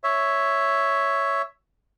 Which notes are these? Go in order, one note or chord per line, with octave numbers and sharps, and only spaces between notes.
C#5 E5